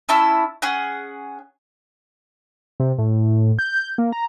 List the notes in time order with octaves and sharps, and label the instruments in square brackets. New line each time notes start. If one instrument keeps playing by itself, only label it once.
[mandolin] C#4 E4 A5 E6
C#4 G#4 F#5
[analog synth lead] C3
A2
G6
A#3
A#5